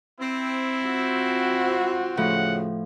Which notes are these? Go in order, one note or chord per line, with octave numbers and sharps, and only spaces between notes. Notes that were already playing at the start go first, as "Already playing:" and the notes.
C4 E4
F4 F#4
A2 C#3 F3 F#5